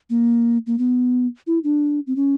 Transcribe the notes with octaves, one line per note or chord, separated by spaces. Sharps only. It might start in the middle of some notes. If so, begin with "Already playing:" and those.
A#3
A#3
B3
E4
D4
C4
C#4